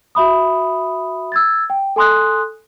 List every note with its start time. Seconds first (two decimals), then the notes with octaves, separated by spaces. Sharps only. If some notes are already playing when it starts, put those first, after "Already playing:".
0.15 F#4 E5 B5 D#6
1.32 E6 G#6 A6
1.70 G5
1.96 A4 G#5 C6 D#6 F#6